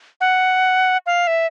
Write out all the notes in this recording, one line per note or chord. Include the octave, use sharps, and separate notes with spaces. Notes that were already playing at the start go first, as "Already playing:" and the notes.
F#5
F5
E5